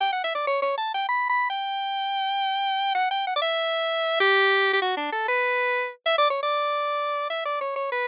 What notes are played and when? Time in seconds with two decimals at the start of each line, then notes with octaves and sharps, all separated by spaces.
0.01 G5
0.12 F#5
0.24 E5
0.35 D5
0.47 C#5
0.62 C#5
0.78 A5
0.94 G5
1.09 B5
1.29 B5
1.50 G5
2.95 F#5
3.11 G5
3.27 F#5
3.36 D5
3.42 E5
4.20 G4
4.73 G4
4.82 F#4
4.97 D4
5.13 A4
5.28 B4
6.06 E5
6.18 D5
6.30 C#5
6.43 D5
7.30 E5
7.46 D5
7.61 C#5
7.76 C#5
7.92 B4